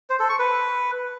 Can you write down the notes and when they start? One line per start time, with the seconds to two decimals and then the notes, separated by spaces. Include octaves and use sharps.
0.10 C5
0.20 A4
0.29 C#6
0.39 B4